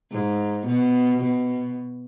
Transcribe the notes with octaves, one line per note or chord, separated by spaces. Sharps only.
G#2
B2
B2